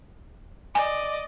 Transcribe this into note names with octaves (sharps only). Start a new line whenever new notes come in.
D5 D#5 G#5